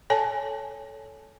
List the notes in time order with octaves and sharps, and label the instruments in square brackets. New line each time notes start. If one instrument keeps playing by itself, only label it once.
[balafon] A4 C#5 G#5 A5